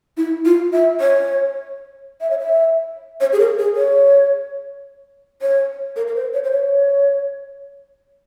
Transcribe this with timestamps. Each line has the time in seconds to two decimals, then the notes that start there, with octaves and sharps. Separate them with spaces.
0.17 E4
0.45 F4
0.73 E5
1.01 C#5
2.21 E5
2.30 C#5
2.39 E5
3.21 C#5
3.33 G#4
3.39 A#4
3.58 G#4
3.76 C#5
5.42 C#5
5.96 A#4
6.08 A#4
6.15 C5
6.34 C#5
6.44 C5
6.52 C#5